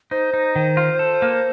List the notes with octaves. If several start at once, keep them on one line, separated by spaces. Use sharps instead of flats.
D#4 C5
D#4
D#3
F4
A4
A#3